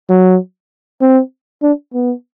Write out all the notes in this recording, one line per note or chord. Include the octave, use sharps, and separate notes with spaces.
F#3
C4
D4
B3